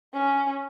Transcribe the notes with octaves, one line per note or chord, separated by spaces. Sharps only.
C#4